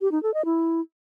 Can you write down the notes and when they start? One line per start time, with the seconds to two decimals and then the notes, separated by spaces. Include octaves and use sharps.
0.01 G4
0.12 D#4
0.23 A4
0.34 D#5
0.45 E4